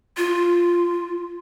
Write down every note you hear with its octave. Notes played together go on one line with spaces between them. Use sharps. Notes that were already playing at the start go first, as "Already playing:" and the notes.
F4